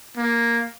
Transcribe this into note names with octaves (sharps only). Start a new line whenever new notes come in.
A#3